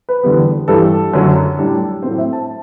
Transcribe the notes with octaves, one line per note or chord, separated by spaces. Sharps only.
B4
E2 D3 G3 B3
G2 E3 G3 A4
F#2 D3 F#3
A2 G3 D4
A2 F#3 A3 C4 C5
E5
A5